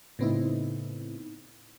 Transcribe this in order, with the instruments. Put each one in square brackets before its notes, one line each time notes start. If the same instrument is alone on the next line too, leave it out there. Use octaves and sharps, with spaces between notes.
[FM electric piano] A2 C#3 B3 C4 D#4 E4